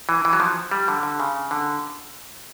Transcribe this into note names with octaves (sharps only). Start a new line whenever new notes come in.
E3
E3
F#3
F3
G3
D3
D3
C#3
D3